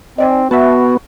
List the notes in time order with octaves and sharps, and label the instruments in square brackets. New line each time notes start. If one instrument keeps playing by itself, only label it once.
[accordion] C4 [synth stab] D#4 D5 G#5
[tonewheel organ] B3 [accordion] F#4 [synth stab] E5 F#5 A5